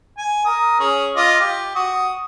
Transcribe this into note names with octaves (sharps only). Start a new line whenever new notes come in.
G#5
A#4 D#6
C#4 G#4
F4 D#5 D6
G4
F#4 D#6